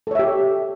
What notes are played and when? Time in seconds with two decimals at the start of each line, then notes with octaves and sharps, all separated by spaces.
0.07 A4
0.11 C#5
0.15 E5
0.19 G4